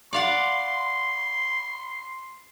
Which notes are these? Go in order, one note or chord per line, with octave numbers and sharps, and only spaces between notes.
D5 F5 F#5 C6